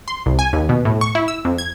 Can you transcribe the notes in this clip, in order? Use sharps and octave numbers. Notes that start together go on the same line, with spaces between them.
C6
C2
G#5
D#2
B2
A2
C#6
E4
E6
F2
G#6